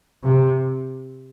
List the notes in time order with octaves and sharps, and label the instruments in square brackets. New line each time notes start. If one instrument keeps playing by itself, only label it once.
[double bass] C3